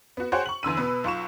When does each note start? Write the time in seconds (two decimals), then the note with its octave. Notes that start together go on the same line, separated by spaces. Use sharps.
0.17 B3 F#4
0.32 F#4 G#4 C5 C#5 F#5 G5
0.46 C#6 F#7
0.63 E2 D3 E6 D#7
0.77 B2 B3 B4
1.04 B1 F4 C#6 E7